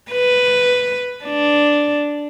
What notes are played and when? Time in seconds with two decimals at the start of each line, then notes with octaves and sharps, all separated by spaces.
0.12 B4
1.25 D4